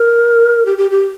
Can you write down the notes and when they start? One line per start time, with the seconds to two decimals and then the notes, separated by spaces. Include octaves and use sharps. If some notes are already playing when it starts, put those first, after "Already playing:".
Already playing: A#4
0.66 G4
0.78 G4
0.91 G4